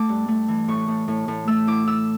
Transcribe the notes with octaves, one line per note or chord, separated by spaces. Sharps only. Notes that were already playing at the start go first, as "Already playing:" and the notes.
Already playing: A3 D6
G2
A3
E3
A2 C#6
A2
A2
A2
A3 E6
E4 D6
E4 E6